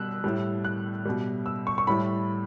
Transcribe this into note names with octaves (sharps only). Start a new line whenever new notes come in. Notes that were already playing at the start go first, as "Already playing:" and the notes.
Already playing: B2 G3 E6 F#6
A2 G3
F#6
B2 G3
E6
C#6
C#6
A2 G3 B5